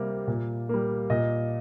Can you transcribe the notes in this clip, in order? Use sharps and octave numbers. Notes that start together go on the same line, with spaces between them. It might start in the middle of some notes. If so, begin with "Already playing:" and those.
Already playing: C3 G3 A#3
A#2
G3 A#3
A#2 D#5